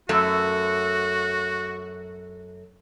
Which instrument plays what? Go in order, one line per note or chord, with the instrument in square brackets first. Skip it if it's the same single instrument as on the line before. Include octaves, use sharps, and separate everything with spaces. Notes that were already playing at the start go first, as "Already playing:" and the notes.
[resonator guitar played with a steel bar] F#2 A3 [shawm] F#4